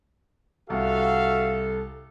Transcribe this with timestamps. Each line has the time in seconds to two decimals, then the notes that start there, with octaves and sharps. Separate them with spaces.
0.70 C2 F#4 A4 E5 F5